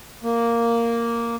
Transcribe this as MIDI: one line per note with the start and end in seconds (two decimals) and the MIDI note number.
0.24 1.36 58